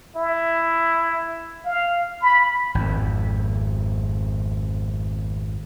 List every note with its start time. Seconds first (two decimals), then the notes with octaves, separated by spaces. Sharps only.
0.16 E4
1.65 F5
2.22 B5
2.75 G#1 F2